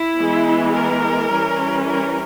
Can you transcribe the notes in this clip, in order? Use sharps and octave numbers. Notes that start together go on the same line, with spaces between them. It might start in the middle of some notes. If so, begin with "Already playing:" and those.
Already playing: E4
E3 G#3 B3
A#4
E3 G3 C#4
A#4